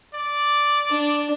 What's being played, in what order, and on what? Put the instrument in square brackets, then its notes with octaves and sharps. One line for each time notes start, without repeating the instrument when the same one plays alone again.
[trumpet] D5
[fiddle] D4